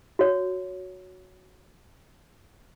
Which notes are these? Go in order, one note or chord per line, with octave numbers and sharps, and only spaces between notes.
F#4 C#5